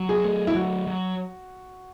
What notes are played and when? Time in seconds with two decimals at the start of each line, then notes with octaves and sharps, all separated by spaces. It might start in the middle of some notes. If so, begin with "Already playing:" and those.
Already playing: F#3
0.09 G#4
0.24 A3
0.47 E4
0.55 F#3 F#4
0.87 F#3